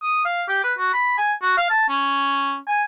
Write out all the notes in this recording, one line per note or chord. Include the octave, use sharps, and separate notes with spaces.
D#6
F5
G4
B4
F#4
B5
G#5
F#4
F5
A5
C#4
G#5